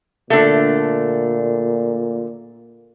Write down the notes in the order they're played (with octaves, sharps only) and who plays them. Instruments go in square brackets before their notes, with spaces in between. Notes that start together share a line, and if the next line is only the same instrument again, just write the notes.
[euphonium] A#2 [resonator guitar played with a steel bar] D3 A3